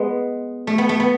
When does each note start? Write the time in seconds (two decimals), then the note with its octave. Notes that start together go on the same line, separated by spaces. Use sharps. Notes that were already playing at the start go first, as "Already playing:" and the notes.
Already playing: G#3 B3
0.67 A3
0.78 B3
0.89 A3
1.00 B3